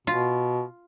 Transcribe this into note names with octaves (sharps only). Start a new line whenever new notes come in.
B2 F4